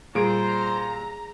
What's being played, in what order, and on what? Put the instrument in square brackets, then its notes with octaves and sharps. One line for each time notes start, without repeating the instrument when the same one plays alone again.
[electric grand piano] A#2 G3 D7 [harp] G#4 [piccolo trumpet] C5 [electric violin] A#5